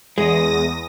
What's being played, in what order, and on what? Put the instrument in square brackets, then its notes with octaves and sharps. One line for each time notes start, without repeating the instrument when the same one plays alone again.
[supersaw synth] E2 D#6 A#6 [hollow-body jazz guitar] G#3